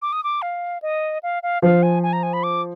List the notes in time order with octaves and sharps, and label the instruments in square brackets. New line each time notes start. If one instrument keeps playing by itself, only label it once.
[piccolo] D6
D#6
D6
F5
D#5
F5
F5
[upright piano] F3 [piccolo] F5
[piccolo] G#5
G#5
A#5
G#5
B5
D6